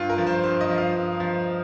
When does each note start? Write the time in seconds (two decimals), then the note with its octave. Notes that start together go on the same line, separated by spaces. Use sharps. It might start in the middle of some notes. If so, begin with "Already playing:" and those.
Already playing: G2 F4
0.10 A#4
0.18 F3
0.27 C5
0.44 G2 C5
0.61 D#5
0.70 F3
0.78 F5
0.95 G2
1.20 F3